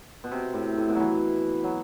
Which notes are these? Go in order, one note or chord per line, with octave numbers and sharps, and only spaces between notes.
B2
C3
A2
A2
B2
F#3
E3
F#3